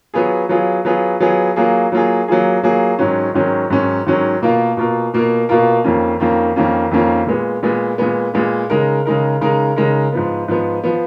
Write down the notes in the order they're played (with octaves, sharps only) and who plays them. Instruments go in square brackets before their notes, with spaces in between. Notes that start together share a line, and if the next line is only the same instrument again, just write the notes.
[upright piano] F#3 B3 F4 G#4
F#3 B3 F4 G#4
F#3 B3 F4 G#4
F#3 B3 F4 G#4
F#3 A#3 F4 G#4
F#3 A#3 F4 G#4
F#3 A#3 F4 G#4
F#3 A#3 F4 G#4
G#2 D#3 F#3 C#4
G#2 D#3 F#3 C#4
G#2 D#3 F#3 C#4
G#2 D#3 F#3 C#4
B2 A#3 F4 A#4
B2 A#3 F4 A#4
B2 A#3 F4 A#4
B2 A#3 F4 A#4
F2 D#3 A#3 C#4 F4
F2 D#3 A#3 C#4 F4
F2 D#3 A#3 C#4 F4
F2 D#3 A#3 C#4 F4
A#2 G#3 B3
A#2 G#3 B3
A#2 G#3 B3
A#2 G#3 B3
C#3 G#3 D#4 A#4
C#3 G#3 D#4 A#4
C#3 G#3 D#4 A#4
C#3 G#3 D#4 A#4
G#2 F3 B3
G#2 F3 B3
F3 B3